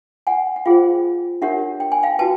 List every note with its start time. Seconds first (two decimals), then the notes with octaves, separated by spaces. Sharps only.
0.27 F#5 G#5
0.56 F#5
0.65 F4 G#4 C5 F5 G5
1.42 D4 G4 A#4 C#5 E5 F#5
1.80 G5
1.92 G#5
2.03 F5 G5
2.19 F#4 B4 G5 A5